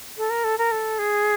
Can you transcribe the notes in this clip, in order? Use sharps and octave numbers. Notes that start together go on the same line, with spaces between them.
A4
A#4
A4
A#4
A4
G#4